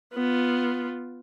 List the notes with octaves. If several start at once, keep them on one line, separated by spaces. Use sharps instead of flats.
B3 F4